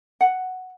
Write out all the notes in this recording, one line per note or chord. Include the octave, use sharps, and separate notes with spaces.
F#5